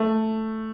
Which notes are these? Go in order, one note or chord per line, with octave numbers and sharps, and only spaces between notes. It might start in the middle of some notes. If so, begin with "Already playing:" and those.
Already playing: A3